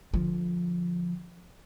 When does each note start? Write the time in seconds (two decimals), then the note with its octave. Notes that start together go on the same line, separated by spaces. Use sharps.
0.14 D3 F3